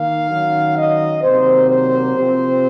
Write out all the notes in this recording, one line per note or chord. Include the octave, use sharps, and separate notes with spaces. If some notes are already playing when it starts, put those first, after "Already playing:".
Already playing: D#3 A#3 F5
D#3 F#3 C#4
D#5
C3 D#3 F#3 A#3 C5
C5
C3 F3 C4